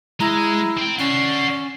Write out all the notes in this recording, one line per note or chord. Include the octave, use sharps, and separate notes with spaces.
G#3 E4 A#5
C4 G5
C#4 D5 F#5 C7